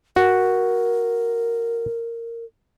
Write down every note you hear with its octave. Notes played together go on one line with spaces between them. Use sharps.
F#4 A#4